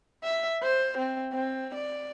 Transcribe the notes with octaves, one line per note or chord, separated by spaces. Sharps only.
E5
C5
C4
C4
D5